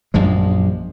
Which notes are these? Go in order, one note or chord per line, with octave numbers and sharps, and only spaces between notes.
A#1 F#2 F3 G#3